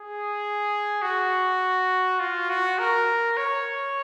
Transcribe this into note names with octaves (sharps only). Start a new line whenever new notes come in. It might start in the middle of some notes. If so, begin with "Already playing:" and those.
Already playing: G#4
F#4
F4
F#4
A#4
C#5